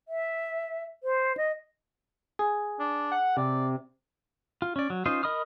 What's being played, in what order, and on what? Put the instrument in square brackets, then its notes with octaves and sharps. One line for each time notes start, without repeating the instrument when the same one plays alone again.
[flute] E5
C5
D#5
[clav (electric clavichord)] G#4
[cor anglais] D4
[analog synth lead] F#5
[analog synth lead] C3 [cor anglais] D5
[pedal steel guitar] F4
C#4 D5
F#3
C#4 D#4 F4 C5 D#5
A#4 D#5 B5 D#6 F6